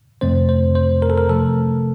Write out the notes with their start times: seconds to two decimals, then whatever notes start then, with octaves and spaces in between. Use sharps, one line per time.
0.21 F2 C3 F3 A3 C4 C5
0.49 C5
0.75 C5
1.02 A#4
1.10 A4
1.18 A#4
1.29 C3 F3 A3 A4